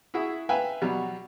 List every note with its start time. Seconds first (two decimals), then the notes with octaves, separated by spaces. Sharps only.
0.14 E4 F#4 G#4 E5
0.49 B4 E5 F5 G5 G#5
0.81 B2 F#3 G3